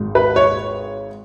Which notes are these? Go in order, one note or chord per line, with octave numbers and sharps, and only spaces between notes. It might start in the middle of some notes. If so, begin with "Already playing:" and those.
Already playing: G#1 G#2
B4
C#5